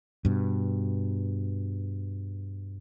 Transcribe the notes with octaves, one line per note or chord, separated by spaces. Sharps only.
G2 B2